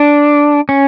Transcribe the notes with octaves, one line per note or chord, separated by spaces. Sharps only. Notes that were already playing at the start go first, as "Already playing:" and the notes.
Already playing: D4
C#4